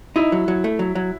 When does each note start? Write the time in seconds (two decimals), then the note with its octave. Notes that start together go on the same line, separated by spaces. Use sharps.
0.16 D#4 E4
0.32 F#3
0.48 F#3
0.64 A3
0.79 F#3
0.95 F#3